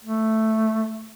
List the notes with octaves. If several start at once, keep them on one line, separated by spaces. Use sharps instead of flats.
A3